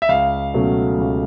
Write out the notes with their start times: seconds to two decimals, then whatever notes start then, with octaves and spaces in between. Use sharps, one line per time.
0.02 E5
0.09 C#2 F5
0.54 B2 F#3 A3 C#4
0.98 C#2